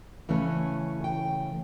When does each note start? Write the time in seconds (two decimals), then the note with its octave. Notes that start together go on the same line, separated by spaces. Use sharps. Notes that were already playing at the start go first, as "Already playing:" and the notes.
0.29 C#3 E3 A3 C#4
1.04 G5